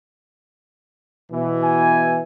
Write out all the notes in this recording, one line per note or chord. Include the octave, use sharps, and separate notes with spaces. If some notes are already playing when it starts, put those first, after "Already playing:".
B2 E3
G#5